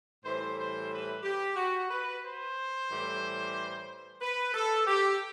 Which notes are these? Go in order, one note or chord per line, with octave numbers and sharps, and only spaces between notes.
A2 E3 G3 C5
C5
B4
G4
F#4
B4
C5
A2 E3 G3
B4
A4
G4